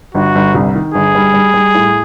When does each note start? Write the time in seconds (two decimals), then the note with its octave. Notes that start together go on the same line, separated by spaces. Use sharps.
0.15 G1 F#4
0.35 G1
0.54 C2
0.75 D#3
0.94 G1 G#4
1.15 G3
1.34 G3
1.54 G3
1.74 A2